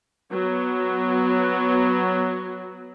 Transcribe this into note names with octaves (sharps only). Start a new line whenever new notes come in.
F#3 B3